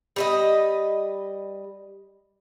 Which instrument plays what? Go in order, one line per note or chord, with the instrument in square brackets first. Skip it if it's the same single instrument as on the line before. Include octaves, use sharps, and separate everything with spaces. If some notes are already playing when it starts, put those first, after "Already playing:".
[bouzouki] G3 B4 D#5